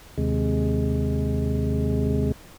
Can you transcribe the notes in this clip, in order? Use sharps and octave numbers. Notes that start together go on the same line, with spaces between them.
D#2 C3 G#3